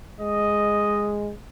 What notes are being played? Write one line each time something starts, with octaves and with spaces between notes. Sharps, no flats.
G#3 D#5